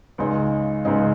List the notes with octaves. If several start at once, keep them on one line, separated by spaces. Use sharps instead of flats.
C#2 C#3 G#3 D#4
C#2 C#3 G#3 D#4